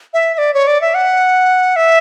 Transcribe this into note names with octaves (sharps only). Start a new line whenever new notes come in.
E5
E5
D5
C#5
D5
E5
F#5
E5